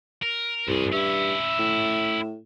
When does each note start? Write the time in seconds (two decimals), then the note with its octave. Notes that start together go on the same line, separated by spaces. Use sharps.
0.23 A#4
0.68 C2 G2 G#4
0.93 G2 C#4 E4 E5
1.59 A2